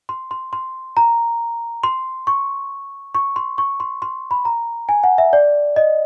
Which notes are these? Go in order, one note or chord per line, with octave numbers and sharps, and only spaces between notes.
C6
C6
C6
A#5
C6
C#6
C#6
C6
C#6
C6
C6
B5
A#5
G#5
F#5
E5
D5
D#5